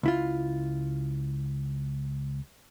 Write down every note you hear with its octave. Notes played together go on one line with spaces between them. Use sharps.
C#2 E4 F4